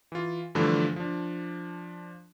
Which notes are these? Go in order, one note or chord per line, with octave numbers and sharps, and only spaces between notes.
E3 F4
G2 D3 E3 F3 A3 D4
F3 D4